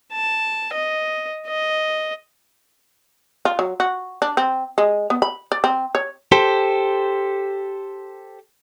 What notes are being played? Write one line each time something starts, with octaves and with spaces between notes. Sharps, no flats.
A5
D#5
D#5
F4
F#3
F#4
D4
C4
G#3
B3
B5
D5
C4
C#5
G4 A4 C5